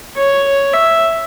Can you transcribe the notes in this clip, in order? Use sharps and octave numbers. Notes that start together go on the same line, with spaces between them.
C#5
E5